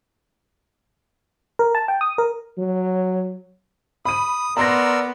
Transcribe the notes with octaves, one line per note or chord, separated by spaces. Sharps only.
A#4
A5
G5
D#6
A#4
F#3
B5 D#6 D#7
B3 A#4 D5 A#5 C6 E6 A#6